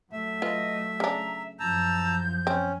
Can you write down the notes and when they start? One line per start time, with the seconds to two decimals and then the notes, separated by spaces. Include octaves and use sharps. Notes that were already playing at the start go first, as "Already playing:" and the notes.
0.12 F#3 A3 E5
0.42 F4 B4 D#5
1.00 C#3 D4 A#5
1.60 F#2 F3 A5 A#5 E6 G6
2.47 C4 C#4